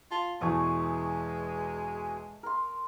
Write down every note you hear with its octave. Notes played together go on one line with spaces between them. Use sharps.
F4 A5
E2 B2 E3 G#3 A3 G#5
A#4 C6